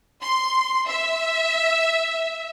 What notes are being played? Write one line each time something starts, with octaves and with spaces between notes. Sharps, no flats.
C6
E5